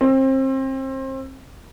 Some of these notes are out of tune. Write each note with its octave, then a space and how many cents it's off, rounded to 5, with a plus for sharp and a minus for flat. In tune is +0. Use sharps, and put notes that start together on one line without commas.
C4 +30